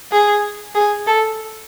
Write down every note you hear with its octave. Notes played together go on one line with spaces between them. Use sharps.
G#4
G#4
A4